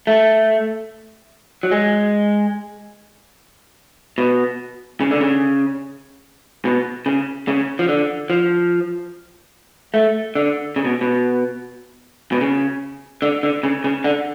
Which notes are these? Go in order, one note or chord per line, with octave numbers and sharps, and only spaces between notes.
A3
F#3
G#3
B2
C#3
D3
C#3
B2
C#3
C#3
F3
D3
F3
A3
D3
C#3
B2
B2
B2
C#3
D3
D3
C#3
C#3
D3